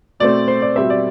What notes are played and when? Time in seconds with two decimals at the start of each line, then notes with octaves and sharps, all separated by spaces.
0.20 B2 A3 C4 D5
0.48 C5
0.62 D5
0.76 B2 G3 C4 E5
0.90 D5